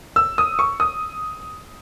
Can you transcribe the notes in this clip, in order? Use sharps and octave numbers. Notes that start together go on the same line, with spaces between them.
E6
D#6
C#6
D#6